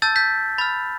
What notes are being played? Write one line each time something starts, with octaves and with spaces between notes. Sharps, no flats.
A5 E6 G6 A6
G6 B6
B5 F6 A6